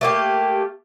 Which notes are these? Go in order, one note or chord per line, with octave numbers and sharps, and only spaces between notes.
A3 A#3 G4